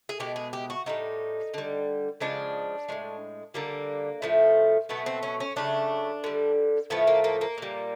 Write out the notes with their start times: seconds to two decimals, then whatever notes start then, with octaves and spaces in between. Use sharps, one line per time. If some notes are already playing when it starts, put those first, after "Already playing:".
0.09 G#4
0.19 B2 G#3 G4
0.36 G#4
0.53 G4
0.70 F#4
0.86 A2 E3 G3 D#4
1.54 D3 G3
2.21 C#3 F3 G#3 D4
2.89 A2 F3 G#3
3.54 D3 G3 A#3
4.22 A2 F3 A3
4.89 B2 F#3 A3 B3
5.06 C4
5.23 C#4
5.40 C#4
5.56 C#3 F#3 A3 D4
6.24 D3 G3
6.90 A2 F3 A3 B3
7.07 A#3
7.24 A#3
7.41 A#3
7.58 A#2 G3